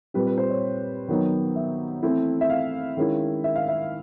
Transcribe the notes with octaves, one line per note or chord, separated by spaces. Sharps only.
A#2 G3 C4 B4
B4
C5
C#5
D#3 F#3 B3 D#4
E5
E3 A3 C4 E4
E5
F5
D#3 G#3 C#4 E4
E5
F5
E5